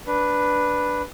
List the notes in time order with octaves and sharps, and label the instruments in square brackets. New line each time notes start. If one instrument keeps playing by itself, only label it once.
[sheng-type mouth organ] D4 B4